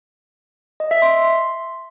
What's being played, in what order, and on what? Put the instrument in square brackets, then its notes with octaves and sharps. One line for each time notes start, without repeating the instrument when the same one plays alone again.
[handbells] D#5
E5
C6